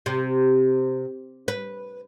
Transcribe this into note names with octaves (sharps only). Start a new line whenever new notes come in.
C3
B4